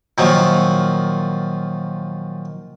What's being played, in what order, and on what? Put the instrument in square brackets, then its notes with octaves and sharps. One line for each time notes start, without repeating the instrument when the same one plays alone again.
[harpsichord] A#2 D#3 F3 F#3